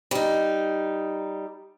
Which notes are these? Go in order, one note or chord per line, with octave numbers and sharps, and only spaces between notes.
G3 D#4